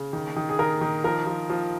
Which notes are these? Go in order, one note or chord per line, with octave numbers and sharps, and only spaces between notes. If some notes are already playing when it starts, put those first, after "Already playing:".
Already playing: C#3
D#3
D#3
G#4
D#3 A#4
D#3
F3 A#4
F3
F3